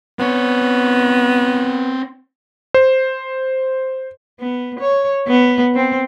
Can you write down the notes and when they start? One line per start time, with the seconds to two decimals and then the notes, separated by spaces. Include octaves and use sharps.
0.19 B3 C4 C#5
2.74 C5
4.40 B3
4.79 C#5
5.27 B3
5.75 C4